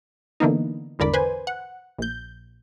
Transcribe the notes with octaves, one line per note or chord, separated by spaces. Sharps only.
D3 E3 A#3 B3 D#4
G#1 E2 D3 A#4 D5 B5
B4 C5 G#5
F#5
A#1 G6